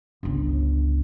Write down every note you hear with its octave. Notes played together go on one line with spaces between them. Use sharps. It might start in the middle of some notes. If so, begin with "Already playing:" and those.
G1 C#2